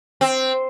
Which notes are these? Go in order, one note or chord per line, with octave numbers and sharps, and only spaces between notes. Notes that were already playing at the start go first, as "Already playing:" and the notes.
C4